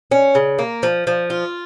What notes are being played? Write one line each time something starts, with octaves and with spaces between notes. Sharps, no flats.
C#4
C#3
A#3
F3
F3
F4